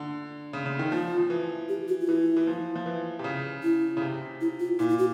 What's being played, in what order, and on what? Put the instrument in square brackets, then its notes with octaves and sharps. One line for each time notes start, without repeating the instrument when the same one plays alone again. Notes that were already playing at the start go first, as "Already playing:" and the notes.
Already playing: [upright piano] D3
C#3
C#3
D#3
[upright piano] F3 [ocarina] F4
[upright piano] F3
E3
[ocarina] G4
F#4
F4
[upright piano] E3 [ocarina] E4
[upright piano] E3
F3
F3
E3
C3
C#3
[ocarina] E4
[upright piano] C#3
C3
[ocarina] E4
F4
[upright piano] A#2 [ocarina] E4
[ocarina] E4
F#4